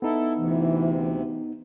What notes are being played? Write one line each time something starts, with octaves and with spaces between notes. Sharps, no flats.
B3 D#4 E4 A4
D2 C3 E3